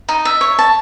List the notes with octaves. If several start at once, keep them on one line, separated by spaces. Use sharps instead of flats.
D#4
E5
C#5
A5